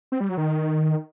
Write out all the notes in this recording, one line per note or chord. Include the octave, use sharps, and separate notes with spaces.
C4
G3
F#3
D#3